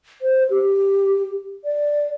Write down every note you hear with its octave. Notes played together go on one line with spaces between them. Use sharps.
C5
G4
D5